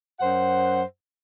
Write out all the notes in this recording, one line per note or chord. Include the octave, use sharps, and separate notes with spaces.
F#2 C5 F#5